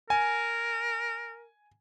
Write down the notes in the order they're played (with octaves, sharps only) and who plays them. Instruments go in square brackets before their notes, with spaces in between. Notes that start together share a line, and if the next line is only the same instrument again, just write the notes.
[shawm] A#4 [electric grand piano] G#5